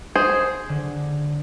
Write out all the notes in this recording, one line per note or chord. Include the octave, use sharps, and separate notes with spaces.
G#4 C5
D3